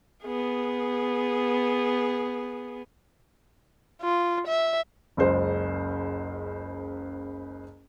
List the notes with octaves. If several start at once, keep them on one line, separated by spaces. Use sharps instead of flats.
B3 G#4
F4
E5
F#1 C#2 C5